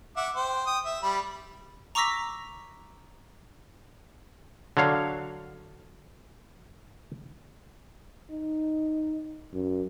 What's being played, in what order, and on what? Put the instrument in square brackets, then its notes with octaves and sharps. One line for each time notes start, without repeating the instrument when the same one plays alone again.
[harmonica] E5 F#5 D6
C5 G5
G5 D#6
E5
G3 B5
[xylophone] A#5 C#6 D6 E6 A#6 B6
[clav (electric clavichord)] D3 F#3 C#5 F5
[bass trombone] D#4
F#2